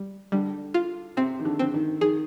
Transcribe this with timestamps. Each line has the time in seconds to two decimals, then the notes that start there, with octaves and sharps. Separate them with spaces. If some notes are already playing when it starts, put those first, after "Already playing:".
Already playing: G3
0.32 D3 G3
0.74 F4
1.17 C3 C4
1.39 D#3
1.45 D3
1.59 D3 C4
1.74 D#3
2.01 D#3 G#4